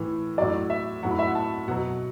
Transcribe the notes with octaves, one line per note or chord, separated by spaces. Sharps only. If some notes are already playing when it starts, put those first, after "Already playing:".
Already playing: A2 E3
A2 F#3 D5
E5
A2 F#3 F#5
B5
E5
F#5
A5
B2 F#3 F#5